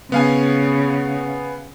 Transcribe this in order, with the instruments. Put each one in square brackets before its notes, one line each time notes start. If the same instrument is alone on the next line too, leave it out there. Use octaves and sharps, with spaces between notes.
[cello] C#3 [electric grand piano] B3 F5 G#5